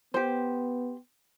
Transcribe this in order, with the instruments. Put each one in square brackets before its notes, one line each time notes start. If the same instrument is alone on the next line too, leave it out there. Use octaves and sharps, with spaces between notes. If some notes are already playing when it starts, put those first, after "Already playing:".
[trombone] B3 [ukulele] G4 C5